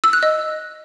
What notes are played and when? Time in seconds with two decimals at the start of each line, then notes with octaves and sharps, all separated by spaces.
0.04 E6
0.13 F#6
0.23 D#5